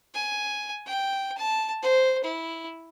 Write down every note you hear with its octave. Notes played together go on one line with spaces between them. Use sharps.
G#5
G5
A5
C5
E4